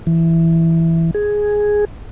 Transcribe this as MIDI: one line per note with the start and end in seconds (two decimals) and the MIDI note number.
0.07 1.11 52
1.15 1.85 68